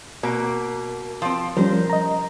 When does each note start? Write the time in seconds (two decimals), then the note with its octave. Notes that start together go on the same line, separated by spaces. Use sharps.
0.23 B2 A#3
1.22 F3 C4
1.57 F3 G3 C#4 A#4 C5
1.90 D#5 A#5